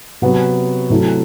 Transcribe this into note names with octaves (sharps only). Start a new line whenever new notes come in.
C3 F#3 B3 F#4
C3 F#3 A3 E4